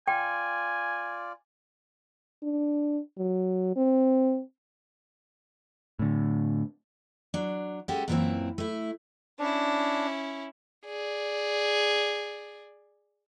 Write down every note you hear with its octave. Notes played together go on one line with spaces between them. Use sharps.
F4 D5 G5 G#5
D4
F#3
C4
A2 D3
F#3 D4
G#3 C#4 F#4 G4 A4
F#2 A#2 E3 G3 A#3 C4
A3 E4
C#4 D4 E4
G#4 D5